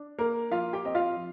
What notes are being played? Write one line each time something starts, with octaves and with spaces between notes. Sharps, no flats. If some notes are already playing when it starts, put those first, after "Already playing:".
Already playing: D4
A#3 A#4
F3 F4 F5
G4 G5
C4 D#5
F4 F5
F3